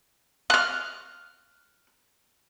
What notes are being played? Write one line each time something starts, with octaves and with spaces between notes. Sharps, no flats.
F6 F#6